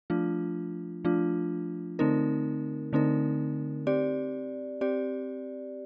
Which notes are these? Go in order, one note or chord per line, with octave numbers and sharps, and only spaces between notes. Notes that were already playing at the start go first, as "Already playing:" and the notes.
F3 A3 D4 F4
F3 A3 D4 F4
D3 A3 C4 D#4 A#4
D3 A3 C4 D#4 A#4
C4 G4 D5
C4 G4 D5